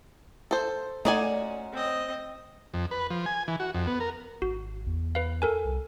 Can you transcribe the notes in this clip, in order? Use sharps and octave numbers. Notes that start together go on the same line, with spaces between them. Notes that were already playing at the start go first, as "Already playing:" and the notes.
A4 C5
A#2 A3 C#4 D#4 F#4 D5 G#5
C4 D#5
F2
B4
F3
G#5
E3
F#4
F2
B3
A#4
G#1 F#4
E2
B4 F5
A4 A#4 G#5
C2